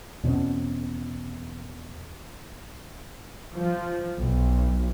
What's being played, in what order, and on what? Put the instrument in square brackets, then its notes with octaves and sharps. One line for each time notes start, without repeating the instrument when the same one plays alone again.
[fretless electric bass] E2 B2 C4 C#4
[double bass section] F3
B1